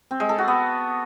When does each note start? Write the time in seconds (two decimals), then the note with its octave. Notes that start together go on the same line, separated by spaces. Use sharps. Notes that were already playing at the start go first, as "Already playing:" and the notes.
0.11 C4
0.20 G#3
0.29 A4
0.38 F#4
0.48 B3